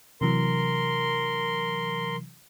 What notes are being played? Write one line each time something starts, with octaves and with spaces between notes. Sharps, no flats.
C3 E3 F#3 A#4 C6